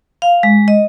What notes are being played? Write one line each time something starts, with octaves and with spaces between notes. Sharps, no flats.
F5
G#3
D#5